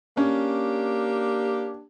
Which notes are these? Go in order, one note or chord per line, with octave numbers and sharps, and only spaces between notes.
A#3 C#4 D4 G4